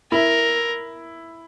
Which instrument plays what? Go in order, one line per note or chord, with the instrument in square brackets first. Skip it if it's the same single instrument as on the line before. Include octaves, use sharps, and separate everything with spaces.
[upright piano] E4 [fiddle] A#4